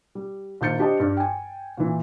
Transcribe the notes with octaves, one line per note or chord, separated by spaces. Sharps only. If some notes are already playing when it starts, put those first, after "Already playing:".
G3
A#1 D#3 C5 G6 A6 C#7
D4 G4 C5 D#5 A5
G2 D5
G5 G#5
A#2 E3